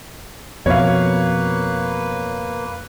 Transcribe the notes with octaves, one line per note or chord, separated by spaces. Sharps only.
F2 B2 A#3 B4 C#5 F5